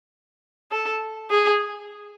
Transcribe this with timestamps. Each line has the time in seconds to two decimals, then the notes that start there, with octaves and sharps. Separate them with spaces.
0.71 A4
1.31 G#4